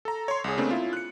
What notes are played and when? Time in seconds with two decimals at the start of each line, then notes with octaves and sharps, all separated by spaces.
0.05 A4 A#5
0.28 C#5 C6
0.44 C2 G#4
0.58 C#3 A3 A#3 C4 D4
0.71 E4 F4
0.93 F#6 C#7